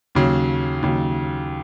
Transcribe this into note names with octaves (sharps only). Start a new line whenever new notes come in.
D#2 C#3 F#3
D#2 C#3 F#3